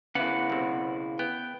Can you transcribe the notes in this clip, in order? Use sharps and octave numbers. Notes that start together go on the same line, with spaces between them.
C#3 B3 E4 F#5 B5 D6
B1 C3
B3 G5